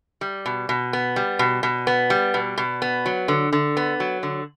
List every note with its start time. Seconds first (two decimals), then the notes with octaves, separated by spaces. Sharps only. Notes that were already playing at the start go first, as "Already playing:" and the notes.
0.21 G3
0.46 B2
0.69 B2
0.93 B3
1.16 G3
1.39 B2
1.63 B2
1.87 B3
2.10 G3
2.34 B2
2.58 B2
2.82 B3
3.06 F#3
3.28 D3
3.53 D3
3.77 B3
4.00 F#3
4.23 D3